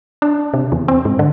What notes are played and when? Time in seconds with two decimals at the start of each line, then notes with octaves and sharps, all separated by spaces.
0.22 D4
0.54 C3
0.72 E2
0.88 C4
1.05 G#2
1.19 D3